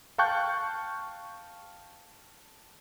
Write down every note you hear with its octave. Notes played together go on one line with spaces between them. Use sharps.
F5 G5 A5 C#6 F#6 G6